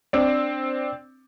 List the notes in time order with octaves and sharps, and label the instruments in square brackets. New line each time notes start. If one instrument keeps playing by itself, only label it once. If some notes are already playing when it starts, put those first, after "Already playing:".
[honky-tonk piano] C4 D4